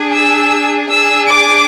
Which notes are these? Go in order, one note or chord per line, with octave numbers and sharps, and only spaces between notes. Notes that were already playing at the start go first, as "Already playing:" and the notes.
Already playing: D4 G#4
E6
D4 G#4 E6
D6